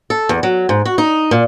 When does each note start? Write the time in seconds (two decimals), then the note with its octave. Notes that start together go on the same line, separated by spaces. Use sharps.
0.10 A4
0.29 E2
0.43 F#3
0.69 G#2
0.85 F#4
0.98 D#4
1.31 A#2